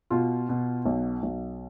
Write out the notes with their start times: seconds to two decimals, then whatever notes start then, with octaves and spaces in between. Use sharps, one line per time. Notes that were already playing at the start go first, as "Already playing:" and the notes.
0.11 B2 F4
0.49 B2
0.86 B1
1.23 B1